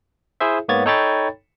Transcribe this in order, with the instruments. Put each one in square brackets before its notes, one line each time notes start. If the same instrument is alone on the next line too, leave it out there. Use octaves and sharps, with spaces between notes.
[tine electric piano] E4 G#4 C5 E5
G#2 A#3 B3 C#5 G#6 A6
D#4 A4 C#5 G5 B5 A6